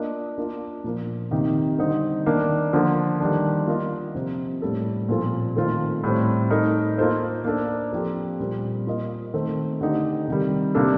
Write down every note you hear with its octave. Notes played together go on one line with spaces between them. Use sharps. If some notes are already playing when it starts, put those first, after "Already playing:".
Already playing: A#3 D4 F4 A#4 D#5
A#3 D4 F4 A#4 D5
A#2 F3 A#3
C3 D#3 A#3 D#4 G4
D3 G3 C4 D#4
D#3 A#3 D4
D3 F3 A#3
D#3 G3 D4
A#3 F4 A#4 D#5
C3 F3 C4
A2 G3 A#3 D4 A4
A#2 F3 C4 F4 A4
D#3 A3 C4 F4 C5
A2 G3 C4
A3 D#4 A#4
A#3 F4 A4 C5 D#5
A#3 D4 A4
F3 C4 G4
A#2 G3 C4
A#3 F4 A#4 D#5
D#3 A3 C4
D3 A3 D#4 G4
C3 D#3 G3
C3 G3 A#3 D4 A4